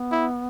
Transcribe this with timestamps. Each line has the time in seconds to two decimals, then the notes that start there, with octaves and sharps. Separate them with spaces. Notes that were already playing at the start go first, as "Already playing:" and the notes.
Already playing: B3
0.12 E4